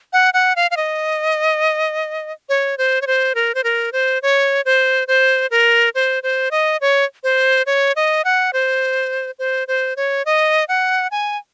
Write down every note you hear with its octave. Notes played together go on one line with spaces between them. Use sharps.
F#5
F#5
F5
F5
D#5
C#5
C5
C#5
C5
A#4
C5
A#4
C5
C#5
C5
C5
A#4
C5
C5
D#5
C#5
C5
C#5
D#5
F#5
C5
C5
C5
C#5
D#5
F#5
G#5